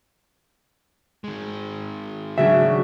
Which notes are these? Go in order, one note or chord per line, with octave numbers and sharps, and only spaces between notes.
D#3 G#3
C#3 F#3 D4 F#4 E5